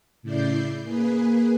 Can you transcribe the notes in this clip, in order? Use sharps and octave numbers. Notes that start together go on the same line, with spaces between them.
A2 C#3 E4 D5 G6 C7
A#3 G#4 B4